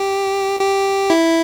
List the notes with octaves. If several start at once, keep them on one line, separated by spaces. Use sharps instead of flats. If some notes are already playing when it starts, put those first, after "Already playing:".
Already playing: G4
G4
E4